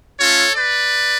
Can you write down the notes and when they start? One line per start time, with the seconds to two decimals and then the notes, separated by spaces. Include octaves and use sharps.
0.19 A3 C#4 F4 A4 C#5
0.56 B4 D5